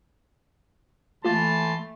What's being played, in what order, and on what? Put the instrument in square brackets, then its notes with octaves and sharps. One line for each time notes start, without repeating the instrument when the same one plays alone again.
[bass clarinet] E3 [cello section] A3 [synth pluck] A#3 F4 [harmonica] A5 C6